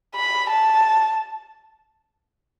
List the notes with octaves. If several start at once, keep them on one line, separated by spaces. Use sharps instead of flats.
B5
A5